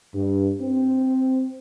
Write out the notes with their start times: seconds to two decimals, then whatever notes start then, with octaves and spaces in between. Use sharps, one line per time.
0.15 G2
0.61 C4